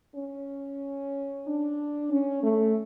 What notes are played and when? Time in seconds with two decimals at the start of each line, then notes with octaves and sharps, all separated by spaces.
0.15 C#4
1.45 D4
2.11 C#4
2.43 A3